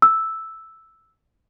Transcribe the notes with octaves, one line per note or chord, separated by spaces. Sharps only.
E6